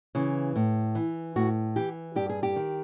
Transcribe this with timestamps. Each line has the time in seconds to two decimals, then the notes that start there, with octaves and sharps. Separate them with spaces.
0.15 C#3 E3
0.56 A2
0.95 E3
1.36 A2 F#4
1.76 E3 G4
2.15 G2 G4
2.29 G#4
2.43 G4
2.56 D#3